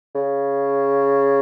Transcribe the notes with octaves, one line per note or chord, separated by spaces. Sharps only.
C#3